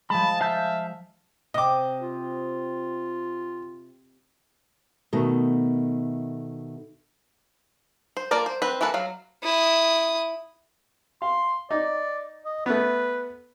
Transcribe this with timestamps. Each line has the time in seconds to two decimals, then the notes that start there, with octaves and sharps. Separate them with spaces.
0.10 F3 G#3 A5 B5
0.41 E5 F5 A5 G6
1.54 C3 D#5 D6
2.00 F4
5.13 B2 D#3 A3
8.17 C5
8.31 A#3 F4 A#4 D5 A5
8.46 C5
8.62 C4 B4
8.81 E3 A#3 F#4 A4 B4
8.94 F#3 F5
9.43 E4 D#6
11.22 F5 C6
11.71 D#4 D5
12.45 D#5
12.66 A3 B3 B4